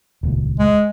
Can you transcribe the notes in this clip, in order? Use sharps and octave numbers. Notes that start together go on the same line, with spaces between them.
D#1 C#2
G#3